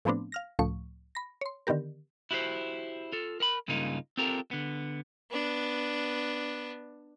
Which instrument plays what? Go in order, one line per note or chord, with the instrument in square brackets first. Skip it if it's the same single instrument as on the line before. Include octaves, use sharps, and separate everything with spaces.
[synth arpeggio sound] A2 F3 A3 B3 C4 D4
F5 F6 A#6
C#2 A2 F3 A3 C#6
B5 A#6
C#5 C6
D3 D#3 B3 G4 A#4
[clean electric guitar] E4 F#4 G4 B4 C5
F4 A4
A#4 B5
G2 C#3 G#3 A#3 D#4 F4
C4 F4 G4 A4 A#4
D3 B3
[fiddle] B3 D4